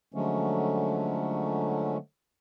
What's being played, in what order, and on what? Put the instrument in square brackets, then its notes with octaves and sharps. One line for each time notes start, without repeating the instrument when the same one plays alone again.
[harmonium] D3 F3 F#3 G#3 A3 C#4